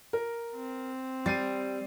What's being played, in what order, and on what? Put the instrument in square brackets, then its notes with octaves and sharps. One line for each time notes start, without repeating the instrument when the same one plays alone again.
[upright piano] A#4
[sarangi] C4
[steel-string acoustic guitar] G3 [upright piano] A6 C7 D#7